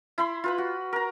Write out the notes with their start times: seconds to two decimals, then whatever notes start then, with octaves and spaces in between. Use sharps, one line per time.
0.18 E4 B5 C6
0.44 F4 B4 B5
0.58 F#4
0.93 A#4 A#5